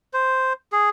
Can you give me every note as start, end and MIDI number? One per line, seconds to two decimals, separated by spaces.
0.14 0.53 72
0.72 0.90 68